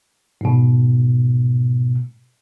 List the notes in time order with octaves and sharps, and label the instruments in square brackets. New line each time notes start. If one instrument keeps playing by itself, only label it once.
[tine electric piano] G#2 B2